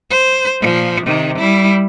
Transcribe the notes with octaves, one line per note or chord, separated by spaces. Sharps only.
C5
A#2 F3
C3 D#3
G3 E4